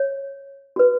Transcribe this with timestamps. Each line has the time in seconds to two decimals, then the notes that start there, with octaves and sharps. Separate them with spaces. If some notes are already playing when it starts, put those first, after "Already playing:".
Already playing: C#5
0.76 F#4 B4